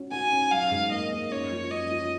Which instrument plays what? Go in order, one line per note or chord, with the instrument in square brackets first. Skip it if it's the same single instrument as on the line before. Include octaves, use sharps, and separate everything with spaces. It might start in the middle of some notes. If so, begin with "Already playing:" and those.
Already playing: [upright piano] C#4 F#4
[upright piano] F#4 [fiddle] G#5
[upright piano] C#4
[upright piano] F#3 [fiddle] F5
[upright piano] G#2
[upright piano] A#3 [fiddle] D#5
[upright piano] A#3
[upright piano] F#2 [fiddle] C#5
[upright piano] F3
[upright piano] F#2 [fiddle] D#5
[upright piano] F3